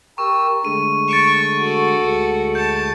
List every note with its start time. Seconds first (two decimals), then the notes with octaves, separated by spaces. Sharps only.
0.18 G4 A#4 C#6 E6
0.65 D3 G#3 A3 D#7
1.08 C#6 A6 D7 E7
1.59 F#4 A4
1.98 D2 G#3 A3
2.55 A5 G6 C#7